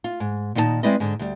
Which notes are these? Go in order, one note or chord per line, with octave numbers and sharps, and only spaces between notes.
F4
G#2
A#2 D#3 D#4 D5 A5
G#3 C4 E4 B4 D5 D#5
G#2 D3
D2 G3